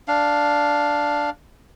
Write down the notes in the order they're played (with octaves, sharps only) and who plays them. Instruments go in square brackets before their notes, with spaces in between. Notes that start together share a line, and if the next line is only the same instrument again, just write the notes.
[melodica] D4 F5